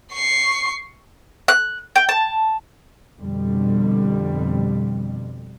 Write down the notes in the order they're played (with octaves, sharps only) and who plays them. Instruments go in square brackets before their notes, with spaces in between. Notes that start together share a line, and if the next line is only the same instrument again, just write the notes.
[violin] C#6 C7
[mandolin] F#6
G5
A5
[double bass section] F2 B2 D3 G3